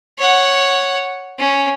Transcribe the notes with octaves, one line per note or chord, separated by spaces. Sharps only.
C#5 F#5
C#4